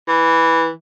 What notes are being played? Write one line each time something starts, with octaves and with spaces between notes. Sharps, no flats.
E3